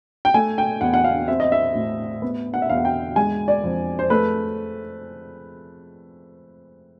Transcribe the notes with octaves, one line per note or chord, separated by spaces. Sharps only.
G5
A3 G#5
G5
E2 F#5
F#5
F5
C4 E5
D#5
E5
A2
B3
F#5
E5
E2 F5
F#5
G5
G#3 G#5
D5
F2
C5
A3 B4